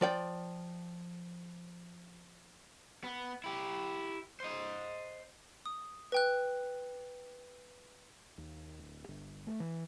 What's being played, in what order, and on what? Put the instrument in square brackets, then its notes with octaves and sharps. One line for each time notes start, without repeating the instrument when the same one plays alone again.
[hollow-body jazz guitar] F3 D5 G5
[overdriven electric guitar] B3
E4 G4
C5 D#5
[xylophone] D#6
B4 G5 F#6
[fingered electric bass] D#2
D1
G1
A3
E3